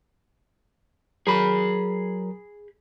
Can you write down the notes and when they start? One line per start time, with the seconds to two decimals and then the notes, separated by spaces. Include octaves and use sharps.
1.27 F#3 G#4 A#4 A#5 B5